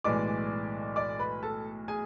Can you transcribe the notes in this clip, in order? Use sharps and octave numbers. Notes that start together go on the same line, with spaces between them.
B1 A2 E3 G#3 D5 D6
D5 D6
B4 B5
A4 A5
G#4 G#5